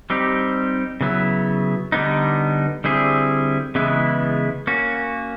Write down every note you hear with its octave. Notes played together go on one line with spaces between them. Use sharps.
G3 C4 D#4 G4
C#3 F#3 B3 E4
D3 G3 B3 D#4
D3 G3 C4 E4 G#4
C#3 E3 G#3 B3 E4
A#3 C#4 F#4